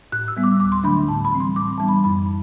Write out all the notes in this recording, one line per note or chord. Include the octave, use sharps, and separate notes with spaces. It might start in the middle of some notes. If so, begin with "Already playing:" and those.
A2 F#6
E6
G3 B3
D6
D2 D6
C6
D3 F#3 A3 D4 B5
A2 A5
B5
E3 G3 C4
C6
A2 D6
E3 G3 B3 D4 A5
B5
F#2 B5